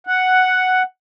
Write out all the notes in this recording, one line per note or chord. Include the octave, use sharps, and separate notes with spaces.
F#5